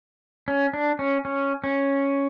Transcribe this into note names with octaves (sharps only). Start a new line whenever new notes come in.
C#4
D4
C#4
C#4
C#4